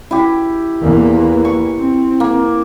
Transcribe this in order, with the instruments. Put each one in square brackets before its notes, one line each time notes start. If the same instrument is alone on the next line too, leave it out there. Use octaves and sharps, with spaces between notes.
[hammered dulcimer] E4 G4
[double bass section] E2 E3 A#3
[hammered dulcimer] C#6
[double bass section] C4
[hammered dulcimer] A#3